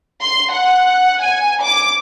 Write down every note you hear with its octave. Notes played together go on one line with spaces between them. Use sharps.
C6
F#5
G#5
D6